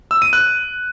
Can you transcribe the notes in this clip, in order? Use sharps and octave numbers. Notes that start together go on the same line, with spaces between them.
E6
D#7
F#6